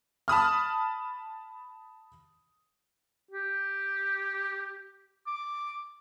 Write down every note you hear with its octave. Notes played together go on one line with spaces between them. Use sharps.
A5 B5 D#6 F6
G4
D6